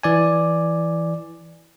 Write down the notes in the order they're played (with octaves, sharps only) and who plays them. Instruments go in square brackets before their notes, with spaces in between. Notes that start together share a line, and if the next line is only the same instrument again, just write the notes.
[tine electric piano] E3 D5 G#5